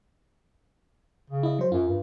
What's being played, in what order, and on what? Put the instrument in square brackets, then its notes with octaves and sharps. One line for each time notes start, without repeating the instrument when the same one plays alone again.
[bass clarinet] C#3
[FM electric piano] E4 D#5
F#3 C5
[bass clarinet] F#2 [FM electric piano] F4
[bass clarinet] G2